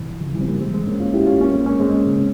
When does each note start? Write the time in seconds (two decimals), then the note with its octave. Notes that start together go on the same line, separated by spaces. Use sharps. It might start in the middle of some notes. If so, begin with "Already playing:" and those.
Already playing: C3 E3
0.21 C#3 F3
0.34 E3 G3
0.41 C4
0.48 G3 A#3
0.61 G#3 C4
0.74 G#3 C4
0.87 A#3 C#4
1.00 C#4 F4
1.14 E4 G4
1.27 C#4 F4
1.41 A#3 C#4
1.54 G#3 C4
1.66 A#3 C#4
1.80 G#3 C4
2.06 C#3